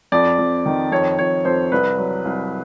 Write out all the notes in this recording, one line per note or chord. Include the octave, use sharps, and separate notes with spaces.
F2 D5
F2
D#3
F2 C#5
F2 C#5
F2 C5
C2 B4
F#3
C2